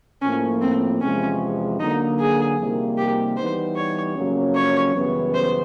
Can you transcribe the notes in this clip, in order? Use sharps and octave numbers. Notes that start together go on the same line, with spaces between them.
A2 F3 A#3 C#4
C4
E2 C3 F3 G#3 C#4
D3 F#3 A#3 D#4
G#4
F2 C3 D#3 G3 A#3
G4
E3 G3 B3 D#4 C5
C#5
F2 C#3 F#3 A#3 C#4
C#5
F#2 C#3 E3 G3 B3
C5